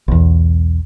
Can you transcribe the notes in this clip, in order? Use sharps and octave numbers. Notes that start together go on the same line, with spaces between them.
B1 E2